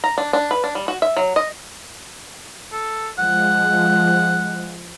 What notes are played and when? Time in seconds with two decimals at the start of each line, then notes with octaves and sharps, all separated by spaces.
0.04 A#5
0.18 D4
0.33 D4
0.51 B4
0.64 D4
0.75 G3
0.88 F#4
1.02 E5
1.17 F#3
1.36 D#5
2.72 A4
3.19 F3 G#3 F#5